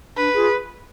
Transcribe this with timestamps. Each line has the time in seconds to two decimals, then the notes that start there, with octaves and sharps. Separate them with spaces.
0.16 D4 B4
0.34 F4 G#4